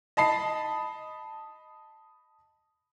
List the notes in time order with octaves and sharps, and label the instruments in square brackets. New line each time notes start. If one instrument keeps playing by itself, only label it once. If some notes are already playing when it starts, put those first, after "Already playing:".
[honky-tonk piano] D#5 A5 B5 C7